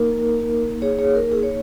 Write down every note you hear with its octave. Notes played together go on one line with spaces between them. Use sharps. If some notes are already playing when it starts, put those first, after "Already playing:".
Already playing: A#3 D#4 A#4
G#4 C#5
G#4 C#5
A#4
G#4
C#5